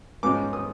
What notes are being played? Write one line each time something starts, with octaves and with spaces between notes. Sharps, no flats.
G#2 F3 G#3 C#4 F4 D6
D#6